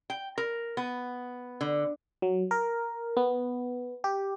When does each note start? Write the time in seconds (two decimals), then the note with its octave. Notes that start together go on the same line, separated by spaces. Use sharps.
0.10 G5
0.38 A#4
0.77 B3
1.61 D3
2.22 F#3
2.51 A#4
3.17 B3
4.04 G4